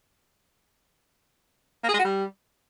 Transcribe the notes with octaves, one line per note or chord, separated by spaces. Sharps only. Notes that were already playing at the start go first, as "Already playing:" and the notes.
A#3
G#4
G#3
F#4
G3